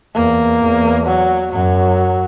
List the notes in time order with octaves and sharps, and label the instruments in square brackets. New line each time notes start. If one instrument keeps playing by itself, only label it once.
[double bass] E2 [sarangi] A#3
[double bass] E2
[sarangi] F#3
[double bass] F#2 [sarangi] F#3